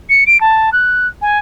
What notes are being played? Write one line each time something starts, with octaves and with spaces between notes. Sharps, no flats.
C#7
D7
A5
F#6
G#5